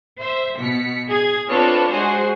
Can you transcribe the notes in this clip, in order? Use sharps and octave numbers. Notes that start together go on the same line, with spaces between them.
C5 E5
B2 B6 C#7
G#4 G#6
C4 D4 F4 A4 B4 C#5
G#3 F#4 G#4 C5